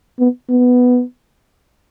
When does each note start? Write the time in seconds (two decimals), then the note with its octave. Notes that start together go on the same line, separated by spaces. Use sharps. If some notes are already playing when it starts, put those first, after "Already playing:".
0.19 B3
0.49 B3